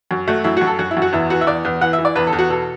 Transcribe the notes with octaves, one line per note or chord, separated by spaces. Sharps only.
F#2
A3 F#4
F#2 E4
F#4
F#2
A4
F#2 F#4
E4
F#2
F#4
E2 E4
E3 F#4
E5
E2 D5
E2
E3 F#5
E5
E3
D5
E2 B4
A4
E2
F#4
B2 A4